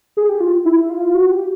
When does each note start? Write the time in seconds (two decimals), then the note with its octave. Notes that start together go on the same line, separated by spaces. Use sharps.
0.17 G#4
0.29 G4
0.40 F4
0.65 E4
0.90 F4
1.15 F#4
1.31 G4